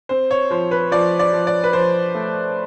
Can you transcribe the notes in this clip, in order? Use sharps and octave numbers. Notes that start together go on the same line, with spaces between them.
C4 C5
C#5
F3 C5
B4
F3 D5
D5
F3
D5
B4
F3 C5
A3